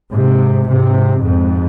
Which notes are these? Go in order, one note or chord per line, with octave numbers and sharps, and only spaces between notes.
G#2 C3
G#2 C3
F2 G#2